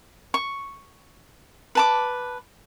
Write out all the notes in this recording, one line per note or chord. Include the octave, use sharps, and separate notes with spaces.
C#6
B4 A5 D6